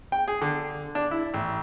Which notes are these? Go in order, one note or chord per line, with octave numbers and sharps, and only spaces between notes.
G5
G#4
D3
D4
E4
A1